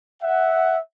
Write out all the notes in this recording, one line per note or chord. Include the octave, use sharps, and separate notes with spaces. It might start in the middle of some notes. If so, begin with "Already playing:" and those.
E5 F#5